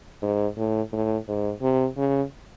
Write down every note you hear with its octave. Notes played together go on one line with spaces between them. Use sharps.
G#2
A2
A2
G#2
C3
C#3